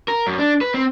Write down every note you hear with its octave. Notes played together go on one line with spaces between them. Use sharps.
A#4
F#2
D4
B4
C4